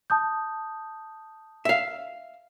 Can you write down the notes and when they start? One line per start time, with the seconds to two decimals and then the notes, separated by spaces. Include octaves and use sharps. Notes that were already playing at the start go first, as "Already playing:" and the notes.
0.10 A5 D#6 G6
1.65 E5 F5